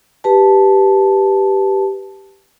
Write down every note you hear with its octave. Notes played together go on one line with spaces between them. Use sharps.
G4 B4 A5